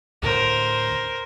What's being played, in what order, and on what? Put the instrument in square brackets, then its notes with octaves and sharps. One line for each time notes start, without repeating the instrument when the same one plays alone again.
[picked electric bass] D2 A2 D3 [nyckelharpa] A#4 C5